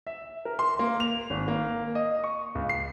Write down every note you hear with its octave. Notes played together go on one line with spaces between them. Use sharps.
E5
A#4
C6
A#3
F7
G#1
A#3
D#5
C#6
C#2
C7